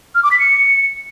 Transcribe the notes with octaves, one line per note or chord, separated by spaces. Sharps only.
F6
D6
B6
C#7